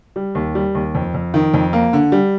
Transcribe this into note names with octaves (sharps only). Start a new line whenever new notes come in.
G3
D#2
G3
D#2
F2
F2
D#3
F2
A#3
D3
G3